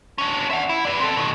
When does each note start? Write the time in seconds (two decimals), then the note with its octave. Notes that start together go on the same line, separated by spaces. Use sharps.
0.18 C#4 D4
0.51 E5 F#5
0.69 E4
0.85 B4 D5
1.00 C4 A4
1.17 B2 D#3